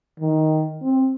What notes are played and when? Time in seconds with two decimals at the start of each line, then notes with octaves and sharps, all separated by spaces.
0.20 D#3
0.82 C4